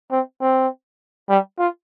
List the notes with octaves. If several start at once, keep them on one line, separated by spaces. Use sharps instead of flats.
C4
C4
G3
F4